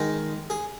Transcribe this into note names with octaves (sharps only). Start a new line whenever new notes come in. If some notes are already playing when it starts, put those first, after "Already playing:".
Already playing: D#3 G#3 D#4
G#4